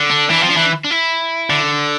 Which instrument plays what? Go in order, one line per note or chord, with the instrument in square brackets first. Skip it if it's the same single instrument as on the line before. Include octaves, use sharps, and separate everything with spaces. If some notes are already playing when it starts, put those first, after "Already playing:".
Already playing: [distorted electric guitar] D3
[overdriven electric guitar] D4
[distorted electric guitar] E3 [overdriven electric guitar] D4
[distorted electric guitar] F3 [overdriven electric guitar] C4
[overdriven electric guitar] D4
[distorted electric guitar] E3
[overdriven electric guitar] D4
E4
[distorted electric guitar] D3